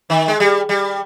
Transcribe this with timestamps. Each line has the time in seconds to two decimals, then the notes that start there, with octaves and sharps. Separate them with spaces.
0.10 D#3
0.28 G#3
0.40 G3
0.69 G3